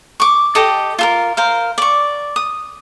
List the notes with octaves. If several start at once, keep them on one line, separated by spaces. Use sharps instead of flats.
C#6 D6
G4 A4 D#5
F4 A4 A#4
A#4 C5 F5
D5 C#6
D#6